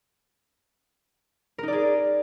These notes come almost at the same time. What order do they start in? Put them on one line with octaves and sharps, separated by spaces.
A#4 D#4 D5 G#4